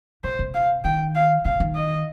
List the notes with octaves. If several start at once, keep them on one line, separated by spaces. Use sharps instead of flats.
C3 C5
C3
F5
D#3 G5
F5
C3 F5
D#3
D#5